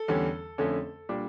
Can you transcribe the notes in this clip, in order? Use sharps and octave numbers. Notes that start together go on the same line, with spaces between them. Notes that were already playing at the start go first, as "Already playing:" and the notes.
Already playing: A4
E2 D3 G3 C#4
F2 D3 A3 C#4
A#2 G3 D4